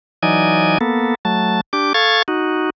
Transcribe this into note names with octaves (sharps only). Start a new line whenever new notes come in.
E3 F#3 D#4 D5 D#5 G#5
A#3 B3 A4
F#3 A3 A5
D4 G4 D6
A4 F5 C#6 G#6 A6
D#4 F#4